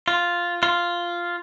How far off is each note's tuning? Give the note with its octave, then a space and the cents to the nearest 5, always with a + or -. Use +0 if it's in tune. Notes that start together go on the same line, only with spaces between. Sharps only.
F4 +0
F4 -5